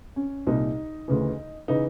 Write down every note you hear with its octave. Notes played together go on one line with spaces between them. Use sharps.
C#4
C2 A#2 D#4
D2 C#3 E3
C#3 E3 D#4